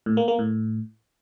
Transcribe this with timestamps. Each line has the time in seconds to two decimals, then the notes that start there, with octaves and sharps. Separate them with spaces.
0.06 A2
0.17 A#3
0.28 A#3
0.39 A2